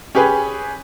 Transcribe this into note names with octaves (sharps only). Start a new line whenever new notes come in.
C#4 G4 G#4 B4